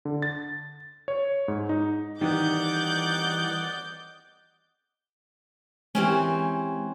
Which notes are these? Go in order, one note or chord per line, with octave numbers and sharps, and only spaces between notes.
D3
A6
C#5
G#2
D#4
D#3 E3 G3 D5 D#5 F#5 D6 G6
E3 G#3 C4 C#4 G4